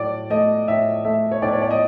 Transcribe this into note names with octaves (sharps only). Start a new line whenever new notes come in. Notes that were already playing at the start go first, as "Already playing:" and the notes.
Already playing: A2 F#3 D5
A3 D#5
A2 E5
A3 E5
C#5
A2 D5
C#5
D5
D#5